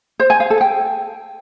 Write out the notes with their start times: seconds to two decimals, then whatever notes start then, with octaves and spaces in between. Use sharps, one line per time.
0.20 C5
0.30 G#5
0.40 F5
0.50 A4
0.61 G5